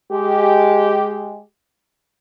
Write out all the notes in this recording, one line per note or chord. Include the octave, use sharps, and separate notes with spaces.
G#3 G4